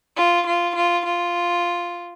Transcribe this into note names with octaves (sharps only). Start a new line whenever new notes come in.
F4
F4
F4
F4